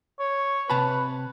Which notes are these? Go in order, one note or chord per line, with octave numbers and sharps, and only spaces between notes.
C#5
C3 B4 A5 B5